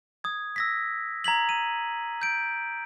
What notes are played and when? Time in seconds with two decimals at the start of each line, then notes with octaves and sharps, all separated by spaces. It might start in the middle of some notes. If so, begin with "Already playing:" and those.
0.24 D#6 G#6
0.56 E6 A#6 B6
1.24 A#5 G#6 B6 F#7
1.49 D#7
2.22 G6 D7